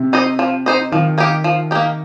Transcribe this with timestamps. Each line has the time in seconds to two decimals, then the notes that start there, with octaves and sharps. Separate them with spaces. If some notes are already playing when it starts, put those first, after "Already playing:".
Already playing: C3
0.13 D#4 C5 D#5
0.39 F3
0.66 D#4 C5 D#5
0.92 D#3 F3
1.18 A#3 D#4 G4
1.44 F3
1.71 A#3 D#4 G4